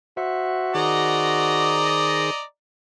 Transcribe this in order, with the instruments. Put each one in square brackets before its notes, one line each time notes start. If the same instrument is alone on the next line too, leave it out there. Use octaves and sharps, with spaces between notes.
[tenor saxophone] F#4 [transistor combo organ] C5 E5
[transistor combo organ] D#3 G#4 C5 [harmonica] D5 D#5 A#5